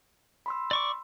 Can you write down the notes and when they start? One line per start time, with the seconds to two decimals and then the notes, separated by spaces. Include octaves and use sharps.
0.46 B5 C6 E6
0.71 D5 C#6 D6